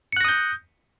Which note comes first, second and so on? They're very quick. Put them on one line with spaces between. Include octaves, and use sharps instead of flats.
C#7 F#6 A#6 D#6 G6